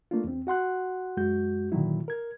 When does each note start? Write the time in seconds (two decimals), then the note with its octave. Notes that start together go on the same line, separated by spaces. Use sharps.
0.11 A3 A#3 D4 F4
0.24 E2 C4
0.47 F#4 F#5 C6 F#6
1.17 F#2 G#3 F#4 G6
1.72 A#2 D3 D#3 F#3 E4
2.08 A#4 G#6